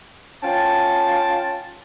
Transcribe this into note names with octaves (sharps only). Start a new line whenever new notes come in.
C#4 F4 G5 A5